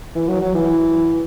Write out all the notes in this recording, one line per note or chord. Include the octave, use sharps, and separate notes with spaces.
E3
F#3
F#3
E3